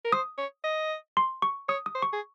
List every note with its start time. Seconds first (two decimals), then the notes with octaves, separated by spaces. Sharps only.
0.05 A#4
0.12 C5 D#6
0.38 C#5
0.64 D#5
1.17 C6
1.42 C#6
1.68 C#5 D#6
1.86 D#6
1.95 C5
2.02 C#6
2.13 G#4